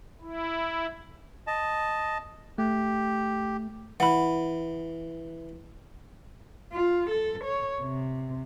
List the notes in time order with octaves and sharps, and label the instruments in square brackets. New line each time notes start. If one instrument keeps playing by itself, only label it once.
[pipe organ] E4
[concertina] D#5 A5
[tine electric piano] A3 [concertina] G4
[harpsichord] E3 [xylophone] F#5 B5
[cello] F4
A4
C#5
C3